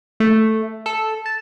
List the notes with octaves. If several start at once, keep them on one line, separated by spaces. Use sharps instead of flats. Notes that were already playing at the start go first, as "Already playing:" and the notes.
A3
A4
A5